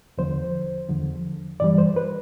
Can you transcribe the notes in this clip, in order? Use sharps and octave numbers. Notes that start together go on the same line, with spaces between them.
E2 D3 F3 C5
E2 D3 F3
G2 E3 G3 D5
C5
B4